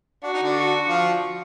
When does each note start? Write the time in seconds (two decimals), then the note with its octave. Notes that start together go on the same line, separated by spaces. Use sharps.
0.23 D4 F#4
0.34 D#4
0.43 D3 D4
0.56 F#4
0.88 F3 F4